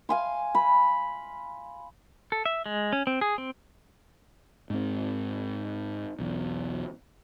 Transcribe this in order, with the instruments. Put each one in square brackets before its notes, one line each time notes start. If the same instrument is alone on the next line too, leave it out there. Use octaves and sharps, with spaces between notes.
[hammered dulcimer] F5 G#5 C6
B5
[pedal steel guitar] A4
E5
G#3
C#4
C4
G#4
C4
[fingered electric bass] G#2 C4
B1 E2